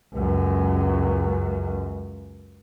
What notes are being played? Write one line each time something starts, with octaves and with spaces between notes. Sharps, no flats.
C#2 F#2